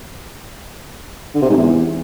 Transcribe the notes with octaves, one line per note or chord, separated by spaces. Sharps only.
D3
C3
G#2
E2